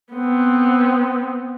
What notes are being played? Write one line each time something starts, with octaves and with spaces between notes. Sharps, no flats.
B3 C4